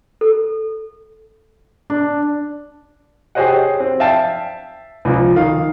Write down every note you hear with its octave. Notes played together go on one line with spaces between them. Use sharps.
A4
D4
G4 G#4 C5 C#5 D#5 F#5
C4
E5 F5 G5 A5
C#2 A#2 F3
D#3 F5